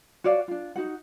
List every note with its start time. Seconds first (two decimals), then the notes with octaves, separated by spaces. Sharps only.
0.24 F#4 C#5 D5 F5
0.48 D4 F4
0.76 D#4 F#4 F#5